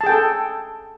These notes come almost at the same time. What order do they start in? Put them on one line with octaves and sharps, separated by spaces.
A5 G#4 G5 A4